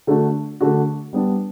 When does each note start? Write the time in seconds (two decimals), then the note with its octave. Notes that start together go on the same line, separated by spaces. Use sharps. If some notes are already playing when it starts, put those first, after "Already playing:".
0.07 D3 A3 D4 F#4
0.61 D3 A3 D4 F#4
1.13 G3 B3 D4